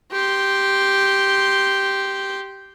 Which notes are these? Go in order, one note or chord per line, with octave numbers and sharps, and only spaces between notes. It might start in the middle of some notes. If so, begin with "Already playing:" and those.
G4 C6